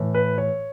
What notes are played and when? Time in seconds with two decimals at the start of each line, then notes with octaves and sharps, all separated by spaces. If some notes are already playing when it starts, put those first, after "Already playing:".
Already playing: A2 E3
0.14 B4
0.38 C#5